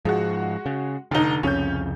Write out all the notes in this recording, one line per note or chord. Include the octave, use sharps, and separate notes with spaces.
G#2 F3 G#3 F#4
C#3
F1 D3 D#4
C2 F2 C#3 C#4 G6